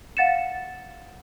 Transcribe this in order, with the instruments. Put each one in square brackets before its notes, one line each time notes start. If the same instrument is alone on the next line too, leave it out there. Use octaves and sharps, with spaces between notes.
[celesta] F5 F#5 A6 C#7 E7